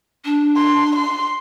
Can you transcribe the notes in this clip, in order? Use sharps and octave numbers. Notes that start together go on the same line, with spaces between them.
D4
C6
C6